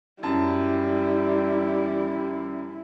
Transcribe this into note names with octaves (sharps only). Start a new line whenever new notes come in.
F#2 G3 E4 A5